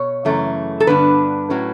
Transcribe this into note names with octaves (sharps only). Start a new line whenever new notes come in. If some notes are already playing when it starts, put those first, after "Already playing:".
Already playing: B2 C#5
F#2 C#3 E3 A3
A4
G2 D3 G3 B3 D4 B4
A2 F#3 C#4